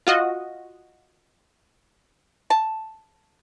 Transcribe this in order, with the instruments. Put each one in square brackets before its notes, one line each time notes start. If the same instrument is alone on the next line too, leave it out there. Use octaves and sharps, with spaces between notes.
[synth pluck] F4 F#4 D#5
[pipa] A5